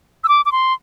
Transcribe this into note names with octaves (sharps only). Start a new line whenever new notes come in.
E6
D6
D6
C6